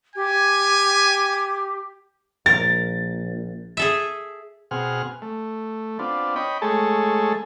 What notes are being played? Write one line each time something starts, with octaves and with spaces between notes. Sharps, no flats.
G4 G#5
A#1 A#4 A6
G#4 A4 E5
B2 C4 G#4 F#5 F6
A3
B3 C4 D4 F4
C#5 D#5 G5 B5
G#3 A3 G#4 A4 C#5 A5